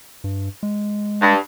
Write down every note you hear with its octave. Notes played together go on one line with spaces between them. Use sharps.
G2
G#3
G2